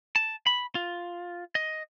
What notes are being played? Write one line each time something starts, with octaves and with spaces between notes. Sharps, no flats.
A5
B5
F4
D#5